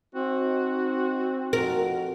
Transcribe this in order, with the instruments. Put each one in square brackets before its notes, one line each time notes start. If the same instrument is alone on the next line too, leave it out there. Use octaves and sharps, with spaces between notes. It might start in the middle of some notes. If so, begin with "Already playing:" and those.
[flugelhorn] C4 [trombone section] D#4 [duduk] F#4
[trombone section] F2 F#4 [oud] A#4